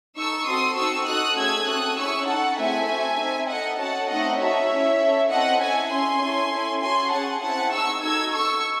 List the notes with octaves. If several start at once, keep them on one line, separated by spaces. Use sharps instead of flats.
D#4 A4 C#6 E6
C4 F#4 A4 C6 D#6
C4 D#4 F#4 A4 C#6 E6
D#4 F#4 A4 D#6 F#6
A3 C#4 G#4 E6 G#6
C4 F#4 A4 D#6 F#6
C#4 E4 G#4 C#6 E6
D#4 A4 F#5 A5
A3 C4 E4 G#4 E5 G#5
C4 F#4 A4
C4 D#4 A4
D#4 A4 D#5 F#5
C#4 F#4 A4 F#5 A5
A3 C4 D#4 D#5 F#5
D#4 F#4 A4 C#5 E5
C#4 E4 G#4
C#4 E4 A4
C4 E4 A4 D#5 F#5
C#4 E4 A4 E5 G#5
C#4 G#4 G#5 C6
C#4 E4 A4
C#4 E4 A4
C#4 F#4 A4 G#5 C6
C#4 G#4 F#5 A5
C4 E4 G#4 F#5 A5
D#4 G#4 C#6 E6
D#4 F#4 A4 E6 G#6
D#4 A4 C#6 E6